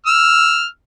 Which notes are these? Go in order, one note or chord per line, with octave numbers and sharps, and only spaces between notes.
E6 F6